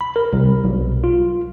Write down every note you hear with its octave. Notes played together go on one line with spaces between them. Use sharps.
B5
A#4
C2
B1
F4